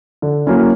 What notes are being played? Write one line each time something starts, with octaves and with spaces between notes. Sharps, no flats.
D3
F#3 A#3 C#4 E4